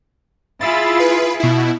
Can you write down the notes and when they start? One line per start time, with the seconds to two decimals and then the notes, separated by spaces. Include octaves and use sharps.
0.61 E4 F4 G#4 B5 E6 A6
1.00 B4
1.40 B2 E4